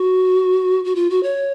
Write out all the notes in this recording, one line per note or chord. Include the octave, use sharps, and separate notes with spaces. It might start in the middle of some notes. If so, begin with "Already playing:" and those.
Already playing: F#4
F#4
F4
F#4
C#5